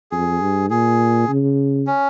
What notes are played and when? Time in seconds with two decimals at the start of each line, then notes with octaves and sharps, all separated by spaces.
0.11 F2 G#4
0.41 G2
0.70 A#2 G#4
1.29 C#3
1.87 C#4